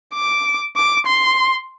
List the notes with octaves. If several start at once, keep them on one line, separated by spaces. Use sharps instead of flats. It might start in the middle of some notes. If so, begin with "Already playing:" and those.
D6
D6
C6